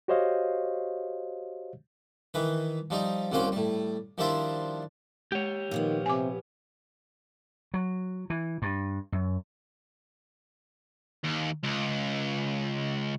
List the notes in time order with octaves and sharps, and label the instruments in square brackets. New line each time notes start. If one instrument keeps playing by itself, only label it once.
[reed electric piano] F#4 G4 C5 C#5 D#5 F5
[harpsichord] D#3 E3 B4
F3 G3 D#4
C2 F#3 A#3 C#4 C5 G5
A2 G3
D#3 F3 G3 D4 E4 C5
[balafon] G#3 [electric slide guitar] G4 C#5
[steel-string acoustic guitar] A#2 F3 B3 [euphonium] D#3
[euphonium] C3 [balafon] G#5 D6
[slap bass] F#3
E3
G2
F#2
[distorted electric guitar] D#2
C#2